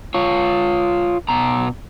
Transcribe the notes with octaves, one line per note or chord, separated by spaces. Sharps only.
F4 C#5
B2 A#5